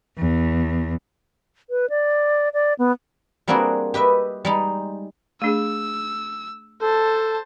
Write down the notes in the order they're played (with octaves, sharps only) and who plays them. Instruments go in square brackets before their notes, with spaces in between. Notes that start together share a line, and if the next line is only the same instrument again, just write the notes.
[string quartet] E2
[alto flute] B4
D5
D5
B3
[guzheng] G3 A#3 C4 D4 F#4 G#4
G4 B4 D#5 E5
G3 G#3 D#4
[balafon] A3 D4 G#4 [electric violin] E6
[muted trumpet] A4 [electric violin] C5 A5